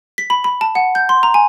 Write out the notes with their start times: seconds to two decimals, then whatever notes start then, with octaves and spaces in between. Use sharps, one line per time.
0.18 B6
0.30 B5
0.44 B5
0.61 A5
0.75 F#5
0.95 G6
1.09 C6
1.23 A#5
1.34 G#5